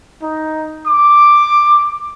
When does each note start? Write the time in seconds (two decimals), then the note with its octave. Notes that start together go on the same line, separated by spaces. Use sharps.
0.22 D#4
0.86 D6